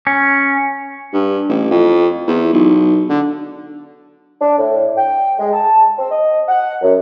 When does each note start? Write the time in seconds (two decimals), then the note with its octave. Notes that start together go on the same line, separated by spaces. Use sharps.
0.07 C#4
1.13 G2
1.49 A1
1.71 F2
2.27 E2
2.53 B1
3.09 D3
4.40 D4
4.58 A2
4.97 G5
5.39 G#3
5.53 A5
5.97 C4
6.11 D#5
6.49 F#5
6.82 F#2